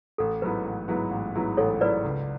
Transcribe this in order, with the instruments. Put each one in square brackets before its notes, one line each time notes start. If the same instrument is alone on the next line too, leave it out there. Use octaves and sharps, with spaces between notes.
[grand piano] A1 [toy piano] A4
[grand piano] G#2 F#3 B3 E4 [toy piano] B4
[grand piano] A1
G#2 F#3 B3 E4
A1
G#2 F#3 B3 E4
[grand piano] A1 [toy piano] A4 C#5
[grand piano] G#2 F#3 B3 E4 [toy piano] B4 D5
[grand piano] C#2